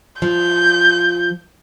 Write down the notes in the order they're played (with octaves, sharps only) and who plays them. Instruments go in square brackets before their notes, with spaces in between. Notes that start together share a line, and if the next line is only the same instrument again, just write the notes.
[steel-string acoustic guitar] F3 [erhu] G6